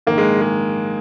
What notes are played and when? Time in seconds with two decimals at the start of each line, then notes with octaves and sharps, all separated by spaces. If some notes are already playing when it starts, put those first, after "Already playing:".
0.07 A#1 G#2 D#3 A#3
0.18 G#3
0.41 G#3